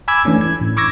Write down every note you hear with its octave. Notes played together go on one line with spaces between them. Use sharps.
G#5 B5 D6 E6 G#6
E3 A3 C#4 D4
G#6
A2
B5 C#6 D6 E6 G#6 A#6